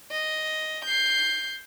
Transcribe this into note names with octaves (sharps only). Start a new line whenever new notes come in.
D#5
G6 C7